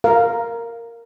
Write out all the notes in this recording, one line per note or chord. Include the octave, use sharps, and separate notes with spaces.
A#4 F5